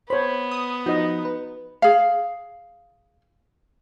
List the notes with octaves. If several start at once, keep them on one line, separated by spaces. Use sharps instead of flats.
B3 C5 C#5 B5
D#6
F3 D#4 F#4 D#5
B4
G#4 F5